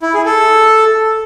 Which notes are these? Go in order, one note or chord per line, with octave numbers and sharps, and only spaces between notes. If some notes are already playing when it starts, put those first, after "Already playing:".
E4
G#4
A4